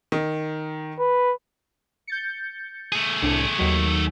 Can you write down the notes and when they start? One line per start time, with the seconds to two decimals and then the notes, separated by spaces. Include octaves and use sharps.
0.12 D#3
0.99 B4
2.07 G6 A6 C#7
2.92 A3 G#4
3.22 C2 A2 D4
3.58 D#2 D#3 F#3